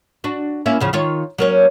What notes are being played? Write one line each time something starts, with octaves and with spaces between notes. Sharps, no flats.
D4 F#4
A#3 C#4 E4
E2 C#3 F3
D#3 F4 C#5
F#3 A#3 C#4